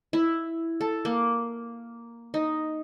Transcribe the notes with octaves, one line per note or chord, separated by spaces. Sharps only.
E4
A4
A#3
D#4